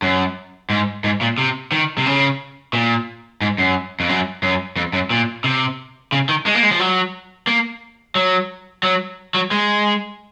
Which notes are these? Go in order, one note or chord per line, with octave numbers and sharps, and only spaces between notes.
F#2
G#2
G#2
A#2
C3
D#3
C3
C#3
A#2
G#2
F#2
F2
F#2
F#2
F2
F#2
A#2
C3
C#3
D#3
G#3
A#3
G#3
F3
F#3
A#3
F#3
F#3
F#3
G#3